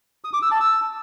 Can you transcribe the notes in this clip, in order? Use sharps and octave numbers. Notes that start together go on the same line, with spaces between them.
D#6
D6
E6
A5
E6